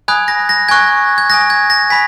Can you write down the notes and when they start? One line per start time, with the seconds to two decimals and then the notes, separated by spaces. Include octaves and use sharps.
0.08 G#5 B5 D#6 F#6 G#6
0.28 A#6
0.49 A#6
0.69 G#5 C#6 F#6 G#6
1.18 G#6
1.30 G#5 D#6 F#6 A#6
1.50 G#6
1.70 A#6
1.90 G#5 B5 B6